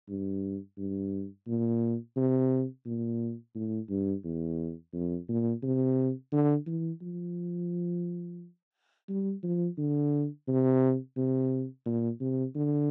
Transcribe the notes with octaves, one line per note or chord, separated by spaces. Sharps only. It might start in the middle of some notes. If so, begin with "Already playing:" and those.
G2
G2
A#2
C3
A#2
A2
G2
E2
F2
A#2
C3
D3
E3
F3
G3
F3
D3
C3
C3
A#2
C3
D3